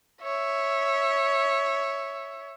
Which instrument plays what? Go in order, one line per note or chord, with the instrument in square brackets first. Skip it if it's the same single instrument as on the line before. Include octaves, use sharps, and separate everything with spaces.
[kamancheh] C#5 E5